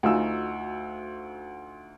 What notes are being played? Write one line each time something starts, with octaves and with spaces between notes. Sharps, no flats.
D2 D#4 F4 F#4 G#5 E6